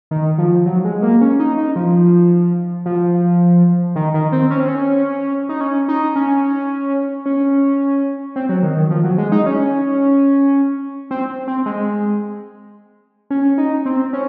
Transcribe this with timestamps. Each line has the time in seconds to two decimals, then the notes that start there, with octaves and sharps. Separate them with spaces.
0.11 D#3
0.38 F3
0.66 F#3
0.84 G#3
1.02 A#3
1.21 C#4
1.39 D#4
1.57 D#4
1.76 F3
2.86 F3
3.96 D#3
4.14 D#3
4.32 C4
4.51 C#4
4.60 C4
4.68 C#4
5.49 D#4
5.61 C#4
5.88 D#4
6.16 C#4
7.26 C#4
8.36 C4
8.49 F#3
8.63 D#3
8.77 D#3
8.91 F3
9.04 F#3
9.18 G#3
9.32 D#4
9.46 C#4
11.11 C4
11.48 C4
11.66 G#3
13.30 C#4
13.58 D#4
13.86 C4
14.13 C#4